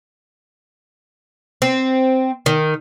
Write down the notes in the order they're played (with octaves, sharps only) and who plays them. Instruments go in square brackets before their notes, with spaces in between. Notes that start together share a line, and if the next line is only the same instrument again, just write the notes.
[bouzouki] C4
D#3